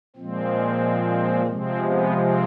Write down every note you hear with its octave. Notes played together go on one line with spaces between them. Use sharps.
A#2 F3 G#3 C4
C3 F3 G#3 C4
B3
C4